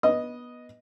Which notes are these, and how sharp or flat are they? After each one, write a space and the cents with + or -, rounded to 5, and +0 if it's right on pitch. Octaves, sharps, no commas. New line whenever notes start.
B3 -15 D#5 +0